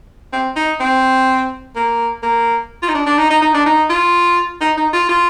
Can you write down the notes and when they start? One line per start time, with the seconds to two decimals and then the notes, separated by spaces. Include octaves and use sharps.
0.33 C4
0.56 D#4
0.80 C4
1.75 A#3
2.23 A#3
2.83 F4
2.89 D#4
2.95 D4
3.06 D4
3.18 D#4
3.30 D#4
3.42 D#4
3.54 D4
3.66 D#4
3.90 F4
4.61 D#4
4.77 D#4
4.93 F4
5.09 F4